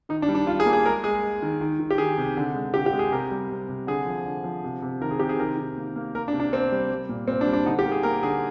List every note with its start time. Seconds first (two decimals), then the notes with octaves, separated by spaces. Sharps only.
0.09 D#3 D#4
0.22 D4
0.28 G3
0.35 D4
0.47 G3 F4
0.60 G#4
0.66 A#3
0.73 G#4
0.85 G#3 A#4
1.03 G#3 G#4
1.23 G#3
1.42 D#3
1.61 D#3
1.80 D#3
1.91 G4
1.98 D#3 G#4
2.17 C3
2.37 D3
2.55 G#3
2.74 D3 G4
2.86 G4
2.93 G#3
2.99 G#4
3.12 C3 A#4
3.31 G3
3.50 C3
3.68 C3
3.87 D3 G#4
4.06 F3
4.25 D3
4.44 F3
4.64 C3
4.82 C3
5.01 D#3 A#4
5.11 G#4
5.19 C3 G4
5.29 G#4
5.39 D#3 A#4
5.57 D#3
5.77 A#3
5.96 A#3
6.15 A#3 A#4
6.28 D4
6.33 C3
6.40 D4
6.52 A#3 C4
6.72 G3
6.90 G3
7.09 A#2
7.28 A#2 C4
7.41 D4
7.47 G3
7.53 D4
7.66 D3 D#4
7.79 G4
7.85 A#3
7.92 G#4
8.03 A#3 A#4
8.23 D3 G#4